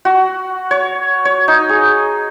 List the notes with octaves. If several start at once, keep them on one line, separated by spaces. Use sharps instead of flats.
F#4
C#5
C#5
D#4
G#4